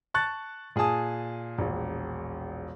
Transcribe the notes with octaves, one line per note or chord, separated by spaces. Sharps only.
A5 C#6 F#6 A6
A#2 G#4 G#5 A5 D#6
E1 A#1